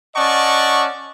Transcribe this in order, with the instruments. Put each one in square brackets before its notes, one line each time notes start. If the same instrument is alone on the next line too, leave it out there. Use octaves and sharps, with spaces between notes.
[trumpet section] C#4 D5 D#5 F#5 A5 C#6